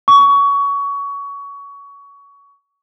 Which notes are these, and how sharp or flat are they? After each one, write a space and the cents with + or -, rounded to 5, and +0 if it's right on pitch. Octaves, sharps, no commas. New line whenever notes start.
C#6 +25